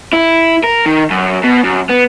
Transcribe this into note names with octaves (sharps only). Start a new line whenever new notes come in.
E4
A#4
D#3
F#2
B2
F#2
B3